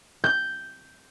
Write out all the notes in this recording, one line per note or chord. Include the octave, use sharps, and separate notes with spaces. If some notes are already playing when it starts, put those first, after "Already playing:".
G6